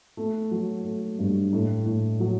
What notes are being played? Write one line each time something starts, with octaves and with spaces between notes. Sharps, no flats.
A3
F#3
A3
G2
A2
A2
F#3